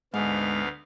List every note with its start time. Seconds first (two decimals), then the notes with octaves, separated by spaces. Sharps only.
0.14 D2 G#2 B3 F5